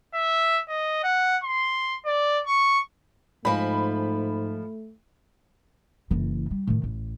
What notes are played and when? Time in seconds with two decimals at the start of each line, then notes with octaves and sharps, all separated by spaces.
0.14 E5
0.69 D#5
1.04 F#5
1.44 C6
2.06 D5
2.46 C#6
3.45 G#2 F3 G#3 A3 B5
6.11 F#1 E3
6.51 G3
6.67 A2 D#3
6.83 A1